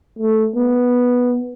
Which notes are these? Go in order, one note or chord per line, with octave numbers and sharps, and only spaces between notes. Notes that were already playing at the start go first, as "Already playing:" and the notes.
A3
B3